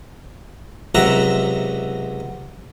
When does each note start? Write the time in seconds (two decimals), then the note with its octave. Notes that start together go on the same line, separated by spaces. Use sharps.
0.95 C#2 C3 F#3 F#4 E5 A#5